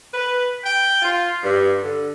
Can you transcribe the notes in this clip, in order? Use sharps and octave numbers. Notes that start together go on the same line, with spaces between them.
B4
G5
F4
G2
D3